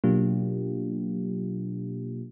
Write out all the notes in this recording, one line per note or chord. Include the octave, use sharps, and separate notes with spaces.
B2 F#3 A#3 D4 F4 G4